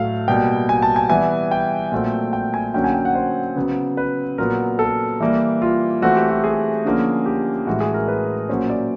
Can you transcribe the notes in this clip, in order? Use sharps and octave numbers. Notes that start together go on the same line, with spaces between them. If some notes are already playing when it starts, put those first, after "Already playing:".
Already playing: A2 F#3 A3 F5
B2 G3 A#3 G5
G#5
A5
G#5
E3 G3 B3 G#5
G5
A#2 F#3 A3 C4
G5
G#5
D3 F#3 A#3 C#4 G5
G#5
G5
F#5
C5
C#3 F#3 B3
B4
A#2 F#3 B3 A#4
A4
E3 G3 A#3
F4
E3 A3 C4 F#4
G4
F#4
G#4
D3 F3 A#3 C#4
G4
A2 E3 G#3 F#4
G#4
A#4
B4
A#2 F#3 A#3 C#4 C5
D5